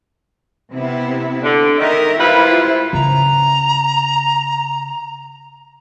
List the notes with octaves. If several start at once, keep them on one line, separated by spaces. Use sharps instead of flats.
C3 B3 E4
D3
D#3 A#4 D#5 E5
G3 A#3 E4 F4 B4 C5
C#3 A#5